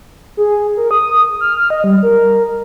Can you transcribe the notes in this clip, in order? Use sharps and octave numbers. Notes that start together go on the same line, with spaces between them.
G#4
A#4
D#6
F6
D#5
G3
A#4